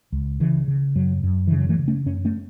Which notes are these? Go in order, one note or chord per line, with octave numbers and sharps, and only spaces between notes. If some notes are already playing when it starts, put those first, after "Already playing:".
C#2
C#3 E3
C#3
F#2 F#3
F#2
C#3 E3
F#3
E3 A3
C#3
A3 C#4
F#2 C#4
A3 C#4